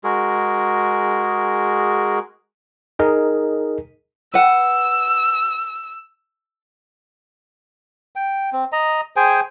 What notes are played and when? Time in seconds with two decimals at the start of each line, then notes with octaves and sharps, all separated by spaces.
0.04 G#3 F#4 G#4 A#4
2.99 D#4 G#4 A#4 D#5
4.34 B4 F#5 E6
8.16 G5
8.53 C4
8.72 D#5 A#5
9.16 G#4 C5 G5 G#5